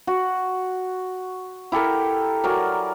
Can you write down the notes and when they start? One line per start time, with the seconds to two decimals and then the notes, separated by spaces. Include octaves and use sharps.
0.07 F#4
1.72 E4 G4 A4 A#4
2.44 F#3 A#4 D5 G#5